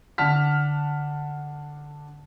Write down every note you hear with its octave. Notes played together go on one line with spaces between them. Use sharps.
D3 D4 F#5 A5 F6 B6